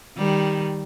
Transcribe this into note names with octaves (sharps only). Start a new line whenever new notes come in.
D#3 G3